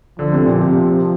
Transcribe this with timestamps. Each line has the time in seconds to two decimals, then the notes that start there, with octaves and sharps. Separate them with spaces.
0.18 D3 F3
0.33 C3
0.46 A#2
0.61 C3